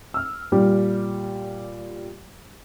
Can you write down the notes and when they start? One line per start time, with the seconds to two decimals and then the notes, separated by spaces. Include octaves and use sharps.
0.14 E6 F6
0.52 A#2 G3 G4